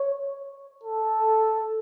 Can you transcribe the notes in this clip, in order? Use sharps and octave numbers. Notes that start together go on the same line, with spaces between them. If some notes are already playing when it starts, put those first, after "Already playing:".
Already playing: C#5
A4